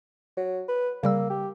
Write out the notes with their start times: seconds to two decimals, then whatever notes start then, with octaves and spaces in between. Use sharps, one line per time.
0.37 F#3
0.69 B4
1.03 C#3 G3 A#3 E6
1.30 G4